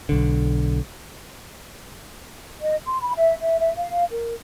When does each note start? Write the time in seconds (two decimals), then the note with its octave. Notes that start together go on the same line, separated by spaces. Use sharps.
0.09 B1 D3
2.60 D#5
2.84 C6
3.01 B5
3.15 E5
3.38 E5
3.58 E5
3.76 F5
4.10 A#4